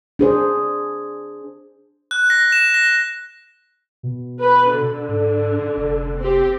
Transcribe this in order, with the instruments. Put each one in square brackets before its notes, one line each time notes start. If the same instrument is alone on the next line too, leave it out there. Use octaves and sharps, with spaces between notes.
[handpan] D4 G#4 C5
[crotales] F#6
A#6
E7
A#6
[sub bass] B2
[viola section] B4
D3
[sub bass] G#2
F1
[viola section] C4 G4